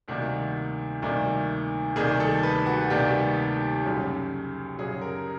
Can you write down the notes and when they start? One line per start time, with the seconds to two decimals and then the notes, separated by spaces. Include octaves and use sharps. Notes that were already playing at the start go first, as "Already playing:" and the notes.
0.08 D2 C3 D#3 G3 A#3 F#4
1.02 D2 C3 D#3 G3 A#3
1.96 D2 C3 D#3 G3 A#3 G#4
2.20 A4
2.43 B4
2.66 F#4
2.90 D2 C3 D#3 G3 A#3 G4
3.84 F#2 C#3 F#3
4.78 F#2 C#3 F#3 G#4
5.02 A#4